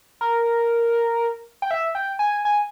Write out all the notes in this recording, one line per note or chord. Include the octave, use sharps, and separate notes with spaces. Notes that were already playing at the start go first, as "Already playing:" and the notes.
A#4
G5
E5
G5
G#5
G#5